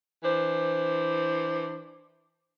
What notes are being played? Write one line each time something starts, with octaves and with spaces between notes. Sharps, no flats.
E3 D4 C5